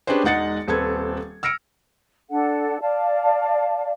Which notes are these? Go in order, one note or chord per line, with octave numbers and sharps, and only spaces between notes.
C#4 D4 G4 G#4 B4 C5
E1 G#3 D#4 F#5 A6 C#7
D#1 C4 A4 B4 G#6
E6 F6 A#6 C#7 D7
D4 A4 F#5
D5 F5 A5